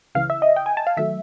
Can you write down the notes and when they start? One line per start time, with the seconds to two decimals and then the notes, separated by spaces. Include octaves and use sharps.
0.15 C#2 C#3 E3 F5
0.30 E5
0.42 D#5
0.56 G5
0.66 G#5
0.77 A5
0.87 F5
0.97 D#2 D#3 F#3 A3 E5